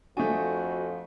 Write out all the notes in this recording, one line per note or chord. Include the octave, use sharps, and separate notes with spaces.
F2 A3 D4 F#4 G#5 D#6 G6